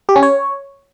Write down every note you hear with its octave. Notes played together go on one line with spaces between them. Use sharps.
G4
C#4
C#5